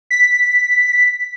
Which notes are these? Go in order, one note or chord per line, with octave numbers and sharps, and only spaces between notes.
B6